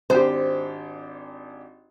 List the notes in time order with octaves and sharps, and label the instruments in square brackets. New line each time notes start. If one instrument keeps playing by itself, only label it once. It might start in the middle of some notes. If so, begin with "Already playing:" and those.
[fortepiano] G#1 D4 G4 [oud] C5